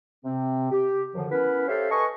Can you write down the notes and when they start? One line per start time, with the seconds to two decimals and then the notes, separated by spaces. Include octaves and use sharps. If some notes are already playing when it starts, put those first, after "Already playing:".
0.25 C3 C4
0.71 G4
1.15 F#2 D3 D#3 F3
1.31 B3 C#4 E4 A#4 B4
1.68 G4 A4 C5 C#5 E5 F5
1.90 A4 B4 D#5 G#5 C#6